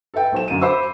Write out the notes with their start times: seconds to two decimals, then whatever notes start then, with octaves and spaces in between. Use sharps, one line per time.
0.14 A4 B4 E5 G5
0.32 B1 C5 E7
0.48 F#2 D3 D#7
0.61 C5 E5 B5 D6 E6